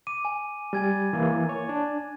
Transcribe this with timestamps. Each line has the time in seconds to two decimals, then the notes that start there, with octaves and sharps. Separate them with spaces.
0.07 D6 D#7
0.25 G#5
0.73 G3 G#5 G#6 A6
1.13 E3 A#3
1.49 C#5
1.69 D4